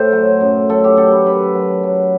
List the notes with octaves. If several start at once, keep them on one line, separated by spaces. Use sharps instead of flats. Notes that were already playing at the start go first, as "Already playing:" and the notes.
Already playing: A2 A4 C5
F#3
F#2
F#3 A4
G4
D#3 A4
B4
F#3 B4
F#3
F#3